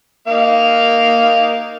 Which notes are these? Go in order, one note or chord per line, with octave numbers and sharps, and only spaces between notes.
A#3 D#4 F5